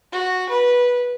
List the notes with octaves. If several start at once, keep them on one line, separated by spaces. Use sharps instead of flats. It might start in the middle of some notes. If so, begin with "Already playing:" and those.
F#4
B4